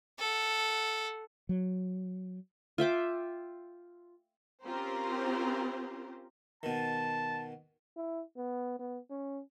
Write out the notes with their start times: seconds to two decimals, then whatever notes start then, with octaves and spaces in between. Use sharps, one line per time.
0.19 A4 F#5
1.49 F#3
2.78 F4 E5 G5 D6
4.64 C4 C#4 F4 G4 A#4 C5
6.63 B2 D#3 A5
7.96 E4
8.37 B3
8.79 B3
9.10 C#4